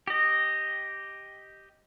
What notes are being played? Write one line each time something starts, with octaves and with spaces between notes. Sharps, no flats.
G4 D#5